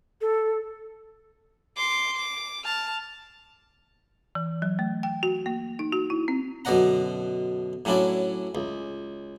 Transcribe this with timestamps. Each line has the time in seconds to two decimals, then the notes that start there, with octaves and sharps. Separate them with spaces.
0.21 A4
1.76 C6 D6
2.17 D6
2.65 A5 F6
4.35 E3
4.62 F#3
4.79 A3
5.03 G5
5.23 F#4
5.46 A#3
5.79 D#4
5.92 F#4
6.10 E4
6.28 C4
6.65 F#2 B2 D3 D5 F#5 A#5
7.85 A2 F#3 C#4 D4 E4 D5
8.55 C#2